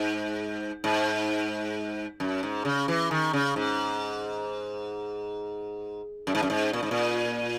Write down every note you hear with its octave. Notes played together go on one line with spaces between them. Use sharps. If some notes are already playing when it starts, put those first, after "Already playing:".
Already playing: G#2
G#2
F#2
G#2
C#3
E3
D#3
C#3
G#2
F#2
G#2
F#2
G#2
A#2
G#2
A#2